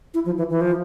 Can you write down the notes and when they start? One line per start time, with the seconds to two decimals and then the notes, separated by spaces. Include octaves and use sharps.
0.14 E4
0.26 F3
0.38 E3
0.50 E3
0.61 F3